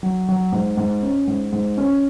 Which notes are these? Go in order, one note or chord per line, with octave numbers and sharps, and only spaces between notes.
F#3
F#3
G#2
G#2
C#4
G#2
G#2
C#4